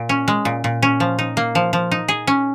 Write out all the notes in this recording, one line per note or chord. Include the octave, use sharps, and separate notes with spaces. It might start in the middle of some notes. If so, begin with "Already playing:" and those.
Already playing: A#2
C#4
G#3
A#2
A#2
C#4
F3
D#4
A#3
F3
F3
D#4
G#4
C#4